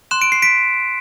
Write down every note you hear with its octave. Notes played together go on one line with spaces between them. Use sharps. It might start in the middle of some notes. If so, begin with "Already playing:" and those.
C6 F#6 E7
D7
C7
B6 D7